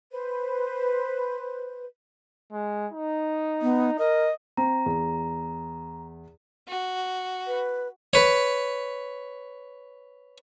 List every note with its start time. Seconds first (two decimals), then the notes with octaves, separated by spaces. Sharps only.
0.11 B4 C5
2.53 G#3
2.92 D#4
3.62 B3
3.99 A#4 D#5
4.57 C4 A#5
4.86 E2
6.68 F#4
7.47 B4
8.13 B4 C#5